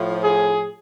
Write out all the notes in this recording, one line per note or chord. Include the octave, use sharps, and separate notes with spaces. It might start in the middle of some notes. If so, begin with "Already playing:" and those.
Already playing: A2 F3
G#4